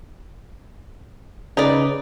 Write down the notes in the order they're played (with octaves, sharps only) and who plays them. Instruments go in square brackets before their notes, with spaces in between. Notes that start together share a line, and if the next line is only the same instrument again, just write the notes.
[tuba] C#3 [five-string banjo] D#4 B4 D5